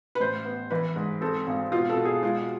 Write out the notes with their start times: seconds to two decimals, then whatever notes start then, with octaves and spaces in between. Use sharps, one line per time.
0.15 B4
0.20 A1 C5
0.45 B3
0.70 E3 B4
0.96 G#2
1.21 C4 A4
1.47 G#1
1.72 B2 F4
1.90 A4
1.97 B2
2.05 G#4
2.23 G#3 F4